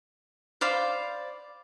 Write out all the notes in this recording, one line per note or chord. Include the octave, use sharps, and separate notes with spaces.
C5 D5 F5 B5